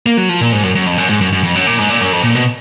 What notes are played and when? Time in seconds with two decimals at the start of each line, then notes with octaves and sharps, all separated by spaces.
0.06 A#3
0.17 F#3
0.29 F3
0.41 A#2
0.52 G#2
0.63 F#2
0.75 F#2
0.86 F2
0.98 F#2
1.09 G#2
1.21 F#2
1.32 F#2
1.44 F2
1.56 F#2
1.67 A#2
1.79 G#2
1.90 A#2
2.01 F#2
2.12 F2
2.24 A#2
2.35 B2